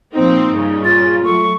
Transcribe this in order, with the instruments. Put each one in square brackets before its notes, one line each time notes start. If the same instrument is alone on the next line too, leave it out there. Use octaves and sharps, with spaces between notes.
[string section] A#2 F3 C4 [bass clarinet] D#4
[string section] G2 A#2 C#3
[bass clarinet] F4 [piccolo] A6
[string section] F#3 A3 [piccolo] C#6